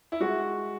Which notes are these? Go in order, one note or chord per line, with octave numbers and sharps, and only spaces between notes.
E4
G#3 F#4